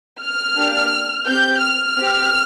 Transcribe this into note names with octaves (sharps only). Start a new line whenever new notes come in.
F6
A#3 D4 G4
C4 G4 G6
F6
C4 G4